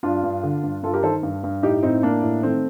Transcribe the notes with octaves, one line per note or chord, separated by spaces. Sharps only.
G2 D4 F4
G2
D3
G2
G2 F4 A4
G4 A#4
D#3 A4 C5
G2
G2
A2 D#4 G4
A2 C4 D#4
A2 A#3 D4
A2
D#3 A3 C4